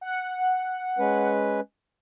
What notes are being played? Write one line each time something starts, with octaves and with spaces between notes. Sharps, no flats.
F#5
G#3 C#4 B4